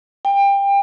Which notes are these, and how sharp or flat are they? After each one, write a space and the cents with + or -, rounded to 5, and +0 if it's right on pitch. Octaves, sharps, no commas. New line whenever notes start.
G5 +25